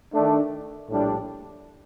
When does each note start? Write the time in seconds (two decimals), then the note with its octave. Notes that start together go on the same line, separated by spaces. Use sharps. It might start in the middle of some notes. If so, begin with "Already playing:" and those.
0.13 D#3 A3 D4
0.89 A#1 A2 G3 D4